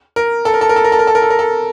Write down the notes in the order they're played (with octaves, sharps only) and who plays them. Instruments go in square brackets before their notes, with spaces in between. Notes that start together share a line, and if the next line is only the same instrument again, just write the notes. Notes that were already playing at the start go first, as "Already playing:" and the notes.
[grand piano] A#4
A4
A#4
A4
A#4
A4
A#4
A4
A#4
A4
A#4
A4
A#4
A4